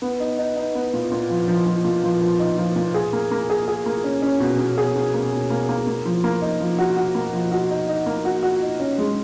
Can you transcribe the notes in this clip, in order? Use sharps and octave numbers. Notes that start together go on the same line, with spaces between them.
B3
D#4
D#4
D#4
B3
A#2
A#2
F3
F3
F3
A#2
F3
F3
D#4
F3
A#2
G#4
A#3
A#3
G#4
G#4
A#3
C#4
C#4
B2
B2
G#4
B2
A#3
B2
A#3
A#3
A#3
F3
A#3
D#4
F3
F#4
F#4
A#3
F3
F#4
D#4
D#4
A#3
F#4
F#4
D#4
C#4
G#3